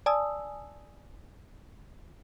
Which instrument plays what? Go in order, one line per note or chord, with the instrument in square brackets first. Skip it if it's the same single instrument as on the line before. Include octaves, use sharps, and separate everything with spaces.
[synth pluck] D5 G#5 A5 D#6 E6